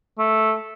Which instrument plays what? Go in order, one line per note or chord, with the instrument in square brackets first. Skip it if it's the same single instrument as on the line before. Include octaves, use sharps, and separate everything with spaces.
[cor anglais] A3